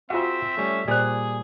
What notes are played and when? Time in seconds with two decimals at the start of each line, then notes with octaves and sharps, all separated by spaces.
0.10 C4 F4 F#4 G#4 C5 E5 F5
0.57 G3 A3 C#4
0.88 A#2 G3 G#4 C5 D5